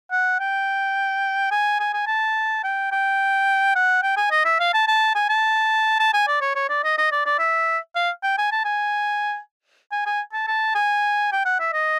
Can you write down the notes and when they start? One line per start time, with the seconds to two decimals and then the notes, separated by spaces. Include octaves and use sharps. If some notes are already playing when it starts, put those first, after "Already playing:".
0.11 F#5
0.39 G5
1.51 G#5
1.80 G#5
1.93 G#5
2.07 A5
2.63 G5
2.92 G5
3.75 F#5
4.03 G5
4.17 G#5
4.31 D#5
4.45 E5
4.59 F5
4.74 A5
4.87 A5
5.15 G#5
5.29 A5
5.99 A5
6.14 G#5
6.27 D5
6.41 C#5
6.55 C#5
6.69 D5
6.84 D#5
6.98 D#5
7.12 D5
7.26 D5
7.39 E5
7.95 F5
8.23 G5
8.38 G#5
8.52 A5
8.65 G#5
9.92 G#5
10.06 G#5
10.33 A5
10.47 A5
10.75 G#5
11.32 G5
11.45 F#5
11.59 E5
11.73 D#5